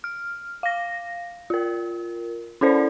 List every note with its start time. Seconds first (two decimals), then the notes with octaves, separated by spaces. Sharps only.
0.04 F6
0.63 F5 A#6
1.50 F4 A#4
2.61 C#4 E4 A4 C5 D5